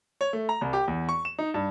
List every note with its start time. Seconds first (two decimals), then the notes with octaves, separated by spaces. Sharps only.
0.21 C#5
0.33 A3
0.49 A#5
0.61 C2
0.73 G4
0.88 E2
1.09 C#6
1.25 E7
1.39 D#4
1.54 G2